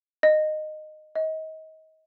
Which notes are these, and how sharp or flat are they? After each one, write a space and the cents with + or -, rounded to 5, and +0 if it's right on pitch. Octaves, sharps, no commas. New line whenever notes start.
D#5 -15
D#5 +30